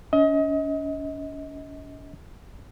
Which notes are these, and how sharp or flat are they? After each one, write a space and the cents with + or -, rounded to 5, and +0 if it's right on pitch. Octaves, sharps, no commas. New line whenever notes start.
C#4 +40 D#5 +30